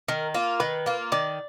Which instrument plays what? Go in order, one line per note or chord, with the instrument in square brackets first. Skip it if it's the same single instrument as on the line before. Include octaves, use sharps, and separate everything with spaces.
[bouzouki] D#3 [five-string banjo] A#4
[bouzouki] A#3 F4
[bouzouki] D#3 [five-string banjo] B4
[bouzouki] A#3 F4
[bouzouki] D#3 [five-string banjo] D5